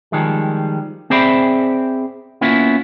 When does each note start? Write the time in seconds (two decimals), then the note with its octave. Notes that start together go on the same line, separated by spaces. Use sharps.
0.12 D#3 F3 G3 G#3
1.10 C4 G#4 C5 D5 E5 B5
2.41 A#3 B3 C#4 E4 F4